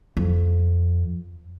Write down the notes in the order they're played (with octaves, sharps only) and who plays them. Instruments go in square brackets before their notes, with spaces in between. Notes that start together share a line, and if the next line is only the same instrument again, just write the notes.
[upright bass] F2